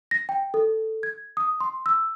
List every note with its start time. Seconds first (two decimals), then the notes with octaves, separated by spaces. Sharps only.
0.11 A#6
0.29 G5
0.54 A4
1.03 G#6
1.37 D#6
1.60 C6
1.86 E6